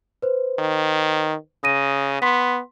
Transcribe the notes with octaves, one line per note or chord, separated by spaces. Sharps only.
B4 C5
D#3
C#3 D#6 A#6 D#7
B3 C6 B6